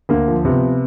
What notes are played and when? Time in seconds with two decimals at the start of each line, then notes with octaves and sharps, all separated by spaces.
0.09 D2 A#3
0.28 F3
0.45 C3 B3